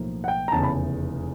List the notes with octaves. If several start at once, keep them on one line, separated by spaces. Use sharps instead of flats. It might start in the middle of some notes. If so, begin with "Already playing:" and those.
Already playing: B1 A2 F3 A#3
F#5
G5
A#5
F1 E2 C#3 A5
B5